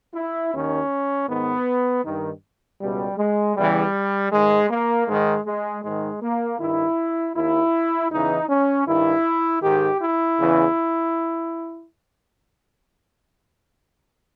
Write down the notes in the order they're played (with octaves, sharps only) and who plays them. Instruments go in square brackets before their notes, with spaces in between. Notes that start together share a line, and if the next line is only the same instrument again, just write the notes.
[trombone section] E4
D#2 D#3 C#4
G#2 D#3 B3
G2 D#3
C#2 B2 G3
G#3
E2 C#3 E3 G3
G#2 D#3 G#3
A#3
G#2 D#3 G#3
G#3
G#2 D#3 G#3
A#3
G2 D#3 E4
D#2 D#3 E4
E2 C#3 E3 D#4
C#4
G2 D#3 E4
G#2 D#3 G4
E4
E2 C#3 E3